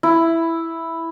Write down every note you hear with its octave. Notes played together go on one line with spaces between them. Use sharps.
E4